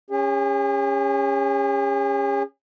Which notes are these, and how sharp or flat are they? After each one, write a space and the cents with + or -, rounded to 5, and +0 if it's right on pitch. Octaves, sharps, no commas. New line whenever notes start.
C#4 +0 G#4 -45